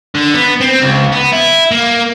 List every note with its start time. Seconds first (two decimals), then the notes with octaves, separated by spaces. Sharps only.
0.15 D3
0.34 B3
0.61 C4
0.82 C#2
1.12 B3
1.33 E4
1.71 A#3